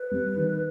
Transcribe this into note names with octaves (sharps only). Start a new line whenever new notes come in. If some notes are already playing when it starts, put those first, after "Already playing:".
Already playing: B4
G3
D#3